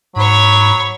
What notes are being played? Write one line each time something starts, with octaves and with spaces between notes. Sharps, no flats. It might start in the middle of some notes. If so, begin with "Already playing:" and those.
G#2 F#3 C#5 B5